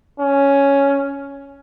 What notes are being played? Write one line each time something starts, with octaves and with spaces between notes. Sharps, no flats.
C#4